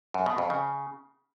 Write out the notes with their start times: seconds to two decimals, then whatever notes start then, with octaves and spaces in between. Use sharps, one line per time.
0.14 F#2
0.26 B2
0.38 F2
0.50 C#3